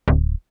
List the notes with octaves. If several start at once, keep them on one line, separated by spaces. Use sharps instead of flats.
D1